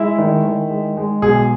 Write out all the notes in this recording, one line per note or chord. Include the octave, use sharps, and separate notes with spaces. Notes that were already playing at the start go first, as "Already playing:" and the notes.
Already playing: G#3 E4 E5
D#3
D#3
G#3
G#3
B1 G#4